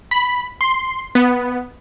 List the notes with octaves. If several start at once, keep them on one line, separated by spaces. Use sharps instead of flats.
B5
C6
B3